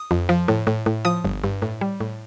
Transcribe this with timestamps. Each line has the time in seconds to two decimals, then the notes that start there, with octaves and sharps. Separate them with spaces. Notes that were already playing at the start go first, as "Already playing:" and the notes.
Already playing: D#6
0.11 F2
0.29 F3
0.48 A2
0.67 A2
0.86 A2
1.05 F3 D#6
1.25 G1
1.44 G2
1.62 A2
1.81 G3
2.00 A2